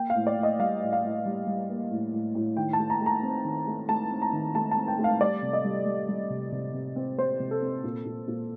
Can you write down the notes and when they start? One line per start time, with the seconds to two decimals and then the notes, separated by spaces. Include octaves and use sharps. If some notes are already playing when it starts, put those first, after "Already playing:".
Already playing: A#3 G5
0.10 F5
0.15 A2
0.27 D5
0.37 A2
0.43 D#5
0.59 G3 F5
0.81 A2
0.93 F5
1.04 A2
1.26 G3
1.47 G3
1.69 A#3
1.91 A2
2.13 A2
2.35 A2
2.57 D#3 G5
2.73 A5
2.79 A3
2.90 A#5
3.01 A3
3.06 A#5
3.23 C4
3.45 D#3
3.67 A3
3.89 A3 A5
4.11 C4
4.22 A#5
4.33 D#3
4.55 A3 A5
4.71 C4 A5
4.88 G5
4.99 A3
5.04 F5
5.21 G3 D5
5.42 C3
5.53 D#5
5.65 G3
5.86 G3
6.08 G3
6.30 C3
6.52 C3
6.74 C3
6.96 C4
7.18 C4 C5
7.40 C3
7.51 A4
7.62 C4
7.84 A#2
8.06 A#2
8.28 A#2